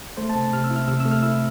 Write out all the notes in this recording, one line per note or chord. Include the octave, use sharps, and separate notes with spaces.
A3 C5
A5
C3
C3 F6
E6
E4
F6
C3 E6
E6
A3
F6
E4 E6